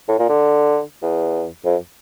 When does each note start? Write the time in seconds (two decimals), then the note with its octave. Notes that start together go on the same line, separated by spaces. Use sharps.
0.08 A2
0.19 A#2
0.29 D3
1.02 E2
1.65 F2